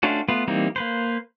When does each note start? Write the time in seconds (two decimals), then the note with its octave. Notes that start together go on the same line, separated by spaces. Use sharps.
0.03 A3 C#4 D4 F4 F#4
0.29 A3 B3 F4 B4
0.48 E3 G3 A#3 C4 D#4
0.76 A#3 B4 C5